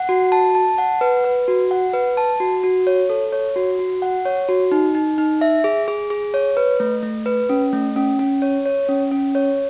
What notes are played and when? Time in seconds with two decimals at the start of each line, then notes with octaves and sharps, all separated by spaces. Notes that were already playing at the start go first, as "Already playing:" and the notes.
Already playing: F#5
0.09 F#4
0.32 A5
0.55 A5
0.78 F#5
1.01 B4
1.24 B4
1.48 F#4
1.71 F#5
1.93 B4
2.17 A5
2.40 F#4
2.64 F#4
2.87 C#5
3.10 A4
3.32 C#5
3.56 F#4
3.79 F#4
4.02 F#5
4.25 C#5
4.49 F#4
4.72 D#4
4.95 D#4
5.18 D#4
5.41 E5
5.64 G#4
5.88 G#4
6.10 G#4
6.34 C#5
6.57 B4
6.80 A3
7.03 A3
7.26 B4
7.49 C#4
7.73 A3
7.96 C#4
8.19 C#4
8.42 C#5
8.66 C#5
8.89 C#4
9.11 C#4
9.35 C#5